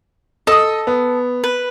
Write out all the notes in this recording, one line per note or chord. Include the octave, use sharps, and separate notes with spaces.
A4 D#5 D#6
B3
B4